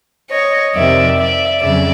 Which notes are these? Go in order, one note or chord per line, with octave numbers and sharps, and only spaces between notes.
C#5 D#5
F2 C3 D#3 D5 E5
D5 E5
F2 C#3 F#3 D5 E5